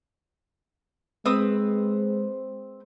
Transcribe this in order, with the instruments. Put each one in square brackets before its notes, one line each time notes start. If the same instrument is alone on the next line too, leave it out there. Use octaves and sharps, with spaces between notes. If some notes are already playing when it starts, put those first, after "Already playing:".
[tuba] G#3 [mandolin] C4 B4 D#6